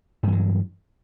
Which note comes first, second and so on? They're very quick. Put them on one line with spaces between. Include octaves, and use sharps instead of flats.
G2 E3 F#3